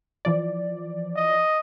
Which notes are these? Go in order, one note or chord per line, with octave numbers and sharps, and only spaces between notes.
E3 F3 D5
D#5